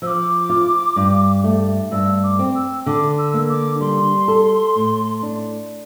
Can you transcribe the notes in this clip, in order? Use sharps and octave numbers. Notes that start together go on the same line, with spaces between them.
F3 D6 E6
F4
G2
A3
G2 E6
D6
C4
E6
D3 D6
E6
A#3
D6
G3 C6
A4
A2
D4